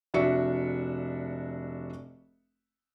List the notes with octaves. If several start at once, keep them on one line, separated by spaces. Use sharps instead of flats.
F1 D4 F#4 E5 C#7